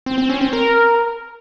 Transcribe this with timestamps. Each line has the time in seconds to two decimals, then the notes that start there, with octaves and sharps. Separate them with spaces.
0.06 C4
0.18 C4
0.30 C#4
0.41 C4
0.53 A#4